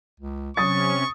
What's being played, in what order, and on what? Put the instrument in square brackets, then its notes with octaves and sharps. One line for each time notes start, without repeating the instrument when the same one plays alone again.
[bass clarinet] C#2
[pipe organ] C3 C#4 [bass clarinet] F#3 [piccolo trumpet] C#6 [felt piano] D#6 A6